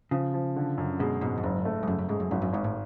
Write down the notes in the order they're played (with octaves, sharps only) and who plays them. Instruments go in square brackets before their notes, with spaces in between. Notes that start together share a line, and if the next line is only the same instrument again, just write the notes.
[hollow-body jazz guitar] C#3 [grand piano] F3
[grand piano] F3
D3
F#2
[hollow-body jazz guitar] B2 [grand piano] G#3
[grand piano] G#2 [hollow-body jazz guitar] B2
[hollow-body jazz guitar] F2
[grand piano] F#1 [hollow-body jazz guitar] F#2
[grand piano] A3
[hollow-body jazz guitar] G#2
[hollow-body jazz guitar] F#2 [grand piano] C#3
[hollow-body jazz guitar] F#2
[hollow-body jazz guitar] G#2 [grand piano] G#3
[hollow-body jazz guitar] F#2
[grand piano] G#1 [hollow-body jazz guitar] F#2
[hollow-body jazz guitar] F#2
[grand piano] G#1 [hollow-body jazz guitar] G#2
[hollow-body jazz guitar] A2